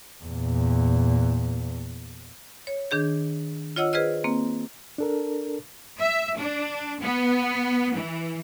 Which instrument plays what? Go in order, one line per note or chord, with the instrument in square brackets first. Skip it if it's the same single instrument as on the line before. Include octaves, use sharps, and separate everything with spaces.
[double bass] E2 A#2
[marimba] C#5
D#3 D4 G#4 G6
F4 C#5 D#5 F#5 E6
G#4 B4 C5 D#5 F6
A#3 C4
[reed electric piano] D4 A4 A#4
[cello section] E5
D4
B3
E3